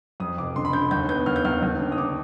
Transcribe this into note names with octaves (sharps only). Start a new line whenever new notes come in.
F2 D#6
F1 D6
D3 C6
B5
D3 G6
D#2 G6
B3 G6
D#2 F6
G6
D#2 F6
D#2
D3
D#6
D3 D6